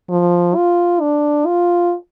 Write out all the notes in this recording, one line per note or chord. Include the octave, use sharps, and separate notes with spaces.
F3
F4
D4
F4